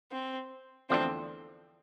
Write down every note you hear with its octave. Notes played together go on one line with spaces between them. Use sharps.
C4
E2 D3 F3 A3 C4 D4